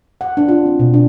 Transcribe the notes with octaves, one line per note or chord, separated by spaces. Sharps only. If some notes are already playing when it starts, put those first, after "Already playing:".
F#5
D4
F4
C4
B2
D4